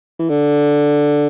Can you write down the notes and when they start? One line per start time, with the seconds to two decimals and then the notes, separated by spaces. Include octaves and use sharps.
0.19 E3
0.30 D3